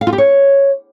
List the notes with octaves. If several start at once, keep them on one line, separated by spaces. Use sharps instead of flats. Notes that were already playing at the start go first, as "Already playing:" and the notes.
F5
F4
G4
C#5